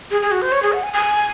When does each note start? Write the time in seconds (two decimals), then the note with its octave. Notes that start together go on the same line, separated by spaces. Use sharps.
0.11 G#4
0.22 G#4
0.32 F#4
0.42 C5
0.52 C#5
0.63 G#4
0.73 F#5
0.83 G#5
0.93 G#5